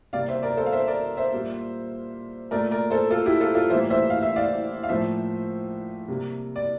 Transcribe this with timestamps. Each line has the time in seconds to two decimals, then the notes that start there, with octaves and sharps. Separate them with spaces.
0.13 C3 G3 A#3 D5 F5
0.28 C5 E5
0.43 A#4 D5
0.57 A4 C5
0.66 F5
0.72 C5 E5
0.88 A#4 D5
1.17 C5 E5
1.32 A#2 G3 A#3
2.51 A#2 A3 A#4 D5
2.71 A#4 D5
2.90 A4 C5
3.11 F4 A4
3.26 E4 G4
3.40 F4 A4
3.55 F4 A4
3.70 A2 E3 G3 A#3 C5 E5
3.90 C5 E5
4.10 F5
4.22 E5
4.36 D5 F5
4.83 F5
4.89 A2 F3 A#3 C5 E5
6.08 C3 G3 A#3
6.56 D5